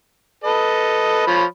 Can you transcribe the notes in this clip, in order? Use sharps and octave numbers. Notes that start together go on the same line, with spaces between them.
A4 B4 D#5
F3 C#5 B5